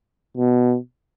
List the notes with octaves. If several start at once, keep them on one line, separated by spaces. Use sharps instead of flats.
B2